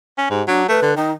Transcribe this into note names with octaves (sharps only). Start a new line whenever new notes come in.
C#4
G#2 G4
F#3 D4
A3 B4
D3
D#3 D#4